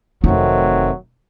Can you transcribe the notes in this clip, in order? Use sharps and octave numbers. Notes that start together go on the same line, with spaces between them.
F1 D#3 F#3 A3 C4 D#4